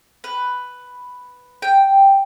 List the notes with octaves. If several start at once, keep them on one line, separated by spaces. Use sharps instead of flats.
B4
G5